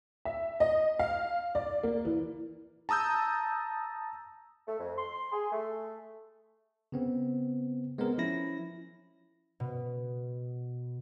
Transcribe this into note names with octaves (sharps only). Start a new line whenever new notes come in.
E5
D#5
F5
D5
A#3
E3
A5 A#5 D#6 E6 G6
A3
F2
C6
G#4
A3
C#3 B3 C4
G#3 B3 C4 A#4
F3 C#4 E4 A#6
B2